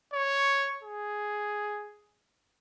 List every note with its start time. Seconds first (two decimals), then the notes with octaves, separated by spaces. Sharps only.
0.13 C#5
0.83 G#4